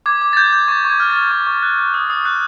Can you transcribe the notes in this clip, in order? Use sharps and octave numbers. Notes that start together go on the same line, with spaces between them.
D6 G#6
D6
A6
G6 G#6
G6
C#6 A6
C#6
G#6
F6
A6
F6
C#6
C#6
F#6
F#6
D#6
D#6
F#6